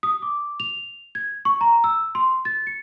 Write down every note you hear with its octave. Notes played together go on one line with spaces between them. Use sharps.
D#6
D6
F7
G#6
C#6
A#5
E6
C6
A6
C#7